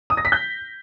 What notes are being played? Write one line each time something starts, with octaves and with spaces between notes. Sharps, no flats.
D#6
A#6
B6
G6